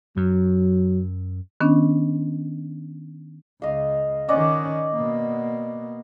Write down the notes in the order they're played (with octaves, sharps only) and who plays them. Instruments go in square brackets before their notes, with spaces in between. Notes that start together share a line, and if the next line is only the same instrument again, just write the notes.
[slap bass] F#2 [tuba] F#3
[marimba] D#3 B3 C#4 D4
[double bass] C#2 [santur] D#5 F5
[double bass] D#3 C#4 [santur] D5 D#5 F#5
[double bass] B2 A#3